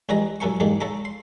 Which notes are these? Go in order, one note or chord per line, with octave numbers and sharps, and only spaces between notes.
C#2 E3 G3 G#4 D#5 A#5
C2 F#2 A4 A#4 G#5 C#6
E2 G#2 G3 G#3 A#3
C#3 A4 A5 A#5 D6
C6